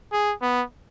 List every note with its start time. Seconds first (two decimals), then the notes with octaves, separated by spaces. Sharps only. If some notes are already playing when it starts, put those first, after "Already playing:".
0.13 G#4
0.42 B3